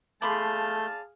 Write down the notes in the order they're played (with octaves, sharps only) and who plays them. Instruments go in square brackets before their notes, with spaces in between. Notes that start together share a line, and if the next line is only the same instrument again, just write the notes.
[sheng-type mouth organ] A3 G6 [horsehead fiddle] G#4 F5 [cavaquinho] D5 B5 C6 [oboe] A5